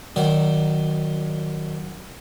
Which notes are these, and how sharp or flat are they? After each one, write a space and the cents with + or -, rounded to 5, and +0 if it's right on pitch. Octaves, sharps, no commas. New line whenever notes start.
D#3 -10 F#3 +0 D5 -20